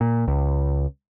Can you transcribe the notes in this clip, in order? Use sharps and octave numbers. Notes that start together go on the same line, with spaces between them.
A#2
C#2